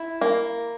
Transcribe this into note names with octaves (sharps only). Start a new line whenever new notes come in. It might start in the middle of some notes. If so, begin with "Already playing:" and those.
Already playing: E4
A#3